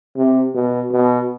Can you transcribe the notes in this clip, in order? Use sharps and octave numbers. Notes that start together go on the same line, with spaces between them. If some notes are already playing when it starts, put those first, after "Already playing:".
C3
B2
B2